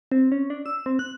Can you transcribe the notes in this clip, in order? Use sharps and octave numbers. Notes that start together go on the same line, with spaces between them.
C4
C#4
D4
E6
C4
F#6